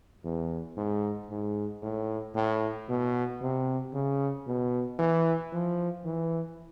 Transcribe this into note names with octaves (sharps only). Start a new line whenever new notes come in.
E2
G#2
G#2
A2
A2
B2
C3
C#3
B2
E3
F3
E3